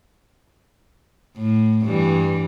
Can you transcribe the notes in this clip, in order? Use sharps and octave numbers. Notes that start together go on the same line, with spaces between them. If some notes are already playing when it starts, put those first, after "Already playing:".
A2
G2 E3 G3